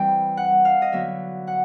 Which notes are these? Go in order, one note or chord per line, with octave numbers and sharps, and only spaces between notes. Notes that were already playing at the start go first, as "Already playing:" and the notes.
Already playing: E3 G3 C4 G5
F#5
F5
D#5
D3 F#3 B3 E5
F#5